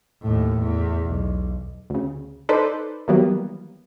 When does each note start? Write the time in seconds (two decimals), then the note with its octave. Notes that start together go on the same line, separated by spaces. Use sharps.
0.21 D#2 A2
0.58 E2
1.05 B1
1.90 D2 C#3
2.49 D#4 A4 B4 C5 D5
3.08 D#3 E3 F#3 G3 A#3 B3